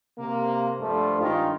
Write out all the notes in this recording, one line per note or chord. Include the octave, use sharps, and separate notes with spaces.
C3 A#3
G2 F3 G3 A3
G2 D#3 G#3 D#4 F4